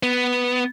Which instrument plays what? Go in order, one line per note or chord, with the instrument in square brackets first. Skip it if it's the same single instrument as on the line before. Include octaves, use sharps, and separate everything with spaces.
[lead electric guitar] B3